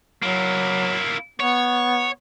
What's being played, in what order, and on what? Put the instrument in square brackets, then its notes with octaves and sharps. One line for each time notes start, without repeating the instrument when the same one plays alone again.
[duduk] F#3 [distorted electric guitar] A#3 E4
[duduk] B3 [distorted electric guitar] C#5